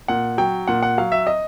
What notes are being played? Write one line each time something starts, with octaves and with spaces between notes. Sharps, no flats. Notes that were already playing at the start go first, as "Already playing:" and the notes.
A#2 F#5
F#3 G5
A#2 F#5
F#5
F#3 F5
E5
D#5